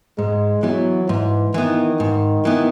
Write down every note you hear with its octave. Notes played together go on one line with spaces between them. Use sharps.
G#2 G#3
E3 F#3 B3
G#2 E3
D#3 E3 B3
G#2
E3 B3